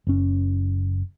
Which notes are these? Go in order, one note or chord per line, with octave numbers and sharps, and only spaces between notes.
F#1 C#4